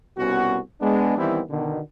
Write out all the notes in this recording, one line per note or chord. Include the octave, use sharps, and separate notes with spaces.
C2 B2 B3 C#4 F#4
G#3 B3 D4
D#3 E3 G3 B3 C4 E4
B2 D3 D#3